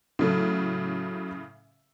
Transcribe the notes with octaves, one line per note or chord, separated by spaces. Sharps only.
A2 C#3 F#3 A4